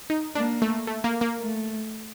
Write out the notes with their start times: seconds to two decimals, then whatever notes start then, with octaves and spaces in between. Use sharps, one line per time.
0.10 D#4
0.35 A#3 D4
0.62 A3
0.87 A3
1.04 A#3
1.21 A#3
1.39 A3